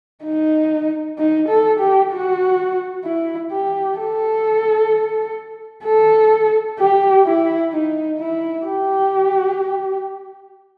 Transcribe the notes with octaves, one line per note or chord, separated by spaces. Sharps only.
D#4
D#4
A4
G4
F#4
E4
G4
A4
A4
G4
E4
D#4
E4
G4